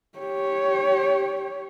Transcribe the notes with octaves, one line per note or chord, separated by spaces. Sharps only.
G4 C#5